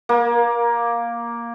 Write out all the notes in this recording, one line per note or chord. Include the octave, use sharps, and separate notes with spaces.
A#3